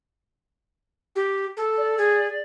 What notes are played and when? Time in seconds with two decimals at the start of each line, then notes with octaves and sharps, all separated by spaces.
1.16 G4
1.57 A4
1.78 D5
1.98 G#4